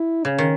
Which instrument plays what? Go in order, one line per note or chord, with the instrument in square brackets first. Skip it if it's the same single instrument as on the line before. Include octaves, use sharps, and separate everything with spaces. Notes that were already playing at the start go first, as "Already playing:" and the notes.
Already playing: [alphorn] E4
[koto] C#3 [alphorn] C#4
[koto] D#3